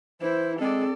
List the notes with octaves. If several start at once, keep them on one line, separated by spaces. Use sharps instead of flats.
E3 E4 C5
G#3 C4 G#4 A4 D5